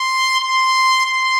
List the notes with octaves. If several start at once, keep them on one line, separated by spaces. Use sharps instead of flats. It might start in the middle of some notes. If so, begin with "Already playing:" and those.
Already playing: C6
C6
C6